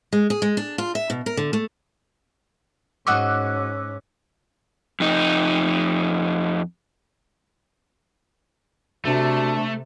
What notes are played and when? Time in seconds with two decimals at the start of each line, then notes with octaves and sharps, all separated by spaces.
0.13 G#3
0.30 G#4
0.42 G#3
0.57 D4
0.78 F4
0.95 E5
1.10 B2
1.26 A#4
1.37 D3
1.53 A3
3.07 G#2 C#4 F#4 D#5 C#6 D6 E6 F#6
5.00 F2 D#4
9.05 C3 A3 D4 F#4